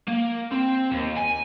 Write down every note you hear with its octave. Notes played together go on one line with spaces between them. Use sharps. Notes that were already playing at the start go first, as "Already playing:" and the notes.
A#3
C4
D#2
G#5